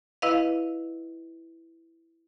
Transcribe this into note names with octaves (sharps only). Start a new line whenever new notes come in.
E4 B4 D#5 F5